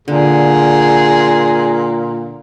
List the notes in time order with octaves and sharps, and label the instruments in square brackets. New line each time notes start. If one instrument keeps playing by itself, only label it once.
[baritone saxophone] A#2 [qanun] D3 [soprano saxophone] G#4